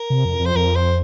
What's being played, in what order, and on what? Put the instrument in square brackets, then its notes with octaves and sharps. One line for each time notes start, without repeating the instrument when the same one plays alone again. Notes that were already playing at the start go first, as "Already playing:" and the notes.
Already playing: [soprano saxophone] A#4
[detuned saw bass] C3
F2
F2
[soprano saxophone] C5
[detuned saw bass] F2 [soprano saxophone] A#4
[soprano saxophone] C5